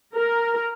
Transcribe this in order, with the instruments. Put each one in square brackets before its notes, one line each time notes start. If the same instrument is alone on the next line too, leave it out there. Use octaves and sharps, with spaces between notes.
[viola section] A#4